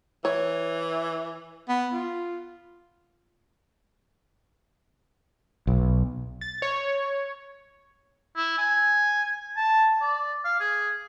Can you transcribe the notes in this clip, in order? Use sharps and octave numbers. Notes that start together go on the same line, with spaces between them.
E3 C#5
B3
F4
B1
A6
C#5
E4
G#5
A5
D5
F5
G#4